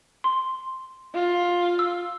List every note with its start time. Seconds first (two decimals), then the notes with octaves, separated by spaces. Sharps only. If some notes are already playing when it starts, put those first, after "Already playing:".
0.24 C6
1.15 F4
1.79 E6